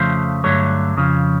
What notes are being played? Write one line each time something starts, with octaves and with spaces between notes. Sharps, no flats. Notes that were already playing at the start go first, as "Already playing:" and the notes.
Already playing: F2 C#3 F3 A3 C5
G2 D3 F#3 A3 C#5
F2 C#3 F3